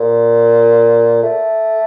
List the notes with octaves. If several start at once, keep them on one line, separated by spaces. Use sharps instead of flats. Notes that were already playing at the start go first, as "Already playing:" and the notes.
Already playing: A#2
A3